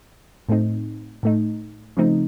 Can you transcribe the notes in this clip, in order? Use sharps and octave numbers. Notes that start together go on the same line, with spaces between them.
A2 A3 C4 D#4
A2 A3 D#4
C#3 F3 A3 C4 D#4